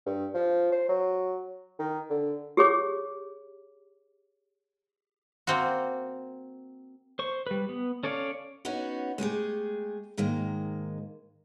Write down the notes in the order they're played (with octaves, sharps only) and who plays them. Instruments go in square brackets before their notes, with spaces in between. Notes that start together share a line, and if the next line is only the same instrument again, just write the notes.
[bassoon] G2
F3
C5
F#3
D#3
D3
[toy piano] G4 G#4 C#5 D6
[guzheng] A#3 C4 F#4
[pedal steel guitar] C5 C#6
G3 B4
B3
C#4 A4 C#5 D5 F5
[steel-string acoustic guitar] B3 C#4 D#4 F#4 C#5
G#3 A3 G4 G#4
G#2 D#3 G#3 A#3